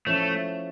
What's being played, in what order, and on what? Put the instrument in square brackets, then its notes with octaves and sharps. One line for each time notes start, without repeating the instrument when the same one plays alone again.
[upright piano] F3 C#4 E4 A4 [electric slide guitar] A3